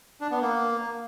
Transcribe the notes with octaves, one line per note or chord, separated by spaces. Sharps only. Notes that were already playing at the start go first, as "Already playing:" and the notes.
D4
B3
A#3